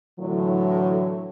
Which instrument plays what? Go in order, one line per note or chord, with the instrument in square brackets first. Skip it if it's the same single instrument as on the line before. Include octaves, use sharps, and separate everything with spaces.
[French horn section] A2 D3 E3 F#3